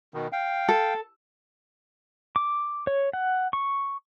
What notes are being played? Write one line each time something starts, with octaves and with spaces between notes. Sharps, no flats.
B2 D#3
F5 G5
A4
D6
C#5
F#5
C#6